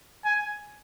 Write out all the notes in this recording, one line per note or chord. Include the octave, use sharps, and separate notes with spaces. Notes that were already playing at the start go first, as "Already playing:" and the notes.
G#5